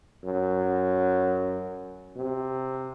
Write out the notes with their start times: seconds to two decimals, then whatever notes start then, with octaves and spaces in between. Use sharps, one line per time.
0.24 F#2
2.16 C3